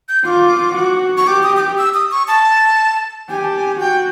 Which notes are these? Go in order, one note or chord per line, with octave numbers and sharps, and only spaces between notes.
G6
F4 D6
F#4
C#6
G4 D6
D#6
D#6
D6
E6
D#6
C#6
A5
G4 G#5
A5
G#5
F#4 G5